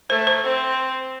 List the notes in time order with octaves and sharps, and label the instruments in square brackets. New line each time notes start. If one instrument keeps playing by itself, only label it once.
[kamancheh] A3 [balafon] C5
[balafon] C5
[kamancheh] C4